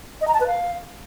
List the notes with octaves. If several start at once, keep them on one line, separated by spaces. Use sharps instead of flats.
D#5
A#5
A5
B4
F5